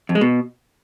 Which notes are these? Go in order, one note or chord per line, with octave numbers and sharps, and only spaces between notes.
F2
G#3
B2